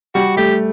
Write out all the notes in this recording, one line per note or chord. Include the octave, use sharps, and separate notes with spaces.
G3 F#4
A3 G4